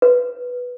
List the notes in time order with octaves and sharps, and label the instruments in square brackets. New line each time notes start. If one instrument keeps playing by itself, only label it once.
[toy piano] B4